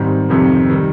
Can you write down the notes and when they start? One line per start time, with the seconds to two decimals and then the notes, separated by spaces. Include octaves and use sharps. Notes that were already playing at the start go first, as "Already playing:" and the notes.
Already playing: G#2 D#3 G3 C4 D#4
0.29 F2 C3 D#3 G3
0.70 D#3 G3